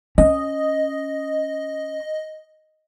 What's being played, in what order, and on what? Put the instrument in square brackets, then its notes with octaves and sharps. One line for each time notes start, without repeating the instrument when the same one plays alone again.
[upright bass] C#4 [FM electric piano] D#5